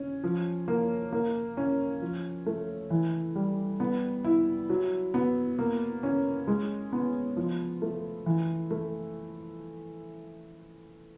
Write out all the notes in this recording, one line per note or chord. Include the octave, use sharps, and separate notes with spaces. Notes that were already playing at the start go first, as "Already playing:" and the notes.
Already playing: C#4
F3
A#3
A#3
C#4
F3
A3
E3
G3
B3
E4
F#3
B3
A#3
C#4
G#3
B3
F3
A3
E3
A3